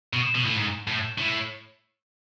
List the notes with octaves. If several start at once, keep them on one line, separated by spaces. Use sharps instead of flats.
B2
B2
A2
G#2
A2
A2